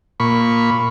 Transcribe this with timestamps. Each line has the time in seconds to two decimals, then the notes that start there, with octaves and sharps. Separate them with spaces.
0.20 A#2 B5 C#6